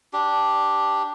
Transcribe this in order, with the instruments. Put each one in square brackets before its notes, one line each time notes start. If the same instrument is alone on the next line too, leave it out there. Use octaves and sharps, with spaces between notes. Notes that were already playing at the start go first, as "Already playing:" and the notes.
[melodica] D4 G4